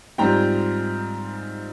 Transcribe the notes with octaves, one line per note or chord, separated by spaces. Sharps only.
G#2 G3 C4 F4 G5 A#5